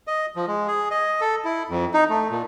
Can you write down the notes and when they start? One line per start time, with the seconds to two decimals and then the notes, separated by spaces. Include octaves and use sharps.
0.07 D#5
0.36 F3
0.47 G#3
0.68 G#4
0.91 D#5
1.21 A4
1.45 E4
1.70 F2
1.94 D#4
2.10 A3
2.31 A#2